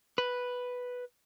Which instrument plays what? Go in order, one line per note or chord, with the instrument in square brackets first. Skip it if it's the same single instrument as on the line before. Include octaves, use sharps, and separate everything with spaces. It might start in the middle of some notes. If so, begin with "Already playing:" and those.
[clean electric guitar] B4